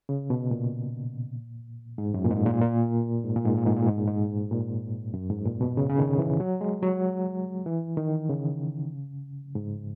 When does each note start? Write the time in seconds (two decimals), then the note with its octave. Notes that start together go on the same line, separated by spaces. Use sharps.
0.09 C#3
0.30 B2
0.51 A#2
1.98 G#2
2.14 F#2
2.24 A#2
2.30 G#2
2.46 A#2
2.61 A#2
3.24 G#2
3.35 A#2
3.45 G#2
3.56 A#2
3.66 G#2
3.76 A#2
3.86 G#2
3.97 A#2
4.08 G#2
4.51 A#2
5.14 F#2
5.29 G#2
5.45 A#2
5.61 B2
5.77 C#3
5.90 C#3
5.98 D#3
6.19 E3
6.40 F#3
6.61 G#3
6.83 F#3
7.66 E3
7.97 D#3
8.29 C#3
9.55 G#2